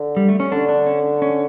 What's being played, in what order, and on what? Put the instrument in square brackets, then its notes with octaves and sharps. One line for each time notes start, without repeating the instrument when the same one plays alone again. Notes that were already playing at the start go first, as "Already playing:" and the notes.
Already playing: [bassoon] D3
[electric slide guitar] G3
A3
C#4
[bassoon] D3 [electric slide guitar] D4
[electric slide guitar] D4
C#4
C#4